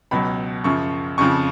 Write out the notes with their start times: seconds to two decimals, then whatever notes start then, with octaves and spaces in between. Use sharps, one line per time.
0.11 C#2 B2 F#3 B5
0.64 F#2 C#3 F3 C#6
1.18 F2 C#3 F3 C#6